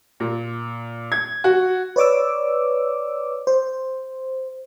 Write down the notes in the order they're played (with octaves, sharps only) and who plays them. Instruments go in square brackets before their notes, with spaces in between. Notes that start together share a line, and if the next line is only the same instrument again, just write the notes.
[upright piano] A#2
G#6
F#4
[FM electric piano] B4 C#5 D5 D6 E6
C5